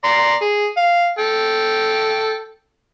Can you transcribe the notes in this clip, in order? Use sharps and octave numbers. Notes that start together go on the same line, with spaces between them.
D5 A#5 C6
G#4
F5
A4 G5